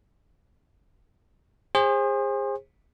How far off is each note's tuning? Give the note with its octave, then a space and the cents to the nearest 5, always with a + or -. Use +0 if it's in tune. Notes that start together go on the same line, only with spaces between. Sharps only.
G#4 -30 C5 +30